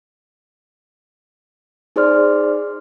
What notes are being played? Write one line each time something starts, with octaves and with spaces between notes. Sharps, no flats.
D#4 G#4 C5 D5 C6 F6